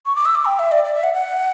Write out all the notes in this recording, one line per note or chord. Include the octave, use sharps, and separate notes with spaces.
C#6
D6
E6
D6
G5
E5
D5
D5
E5
F#5
F#5